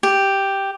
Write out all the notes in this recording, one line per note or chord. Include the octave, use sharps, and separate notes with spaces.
G4